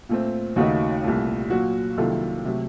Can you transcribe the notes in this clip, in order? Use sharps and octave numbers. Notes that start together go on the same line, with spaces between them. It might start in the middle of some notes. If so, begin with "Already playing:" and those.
A#2 A3 C4
D#2 C#3 A3 D#4 F#4
C2 A#2 A3
A#2 F#3 A#3 F4 F#4
C2 C3 D#3 F#3 A#3 F4 A4
C3 F#3 A3